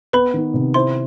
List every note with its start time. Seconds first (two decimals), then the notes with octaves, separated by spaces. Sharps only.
0.13 B3 B4 B5
0.34 D#3
0.54 C3
0.74 E4 C5 C6